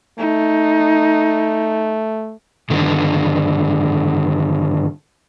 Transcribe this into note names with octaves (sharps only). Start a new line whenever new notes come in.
A3 D#4
G2 D3 D#3